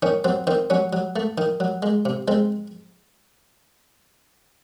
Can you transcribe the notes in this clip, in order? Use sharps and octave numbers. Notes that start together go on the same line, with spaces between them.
D#3 C#4
F#3 C4
D#3 C4
F#3 C#4
F#3
A3
D#3
F#3
G#3
C3
G#3 C4